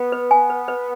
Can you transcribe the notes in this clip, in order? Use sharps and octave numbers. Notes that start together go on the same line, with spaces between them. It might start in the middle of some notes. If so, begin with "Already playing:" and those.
Already playing: B3
B4
G#5
B4
B4